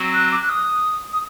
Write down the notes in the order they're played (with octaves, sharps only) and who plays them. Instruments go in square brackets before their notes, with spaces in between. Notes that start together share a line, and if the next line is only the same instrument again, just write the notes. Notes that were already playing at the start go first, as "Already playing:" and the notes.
Already playing: [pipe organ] F#3 C4 F#4
[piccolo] F#6
D6
F#6
D#6
D#6